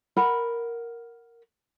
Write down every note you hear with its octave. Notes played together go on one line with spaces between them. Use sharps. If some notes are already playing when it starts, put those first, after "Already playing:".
A#4 F#5 B5